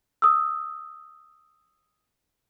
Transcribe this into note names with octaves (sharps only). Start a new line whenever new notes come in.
D#6 E6